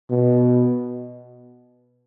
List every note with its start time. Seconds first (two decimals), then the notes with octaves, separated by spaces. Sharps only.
0.10 B2